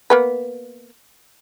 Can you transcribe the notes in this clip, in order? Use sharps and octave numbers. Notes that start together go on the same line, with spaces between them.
A#3 B3 B4